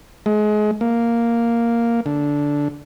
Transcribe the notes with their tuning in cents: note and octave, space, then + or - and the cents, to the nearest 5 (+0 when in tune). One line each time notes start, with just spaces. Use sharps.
G#3 +30
A#3 +0
D3 -10